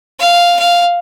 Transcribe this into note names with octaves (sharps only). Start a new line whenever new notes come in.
F5
F5